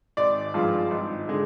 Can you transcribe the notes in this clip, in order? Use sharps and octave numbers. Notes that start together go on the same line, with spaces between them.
G#1 D5
G2 F3 G#3
G#1
D3 G#3